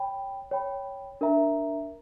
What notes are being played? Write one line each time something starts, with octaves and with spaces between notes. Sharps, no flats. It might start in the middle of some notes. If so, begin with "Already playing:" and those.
Already playing: C#5 G5 B5
C#5 G5 B5
D4 A#4 E5 A#5